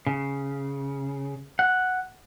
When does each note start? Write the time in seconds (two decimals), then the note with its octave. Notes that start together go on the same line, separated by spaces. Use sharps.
0.06 C#3
1.59 F#5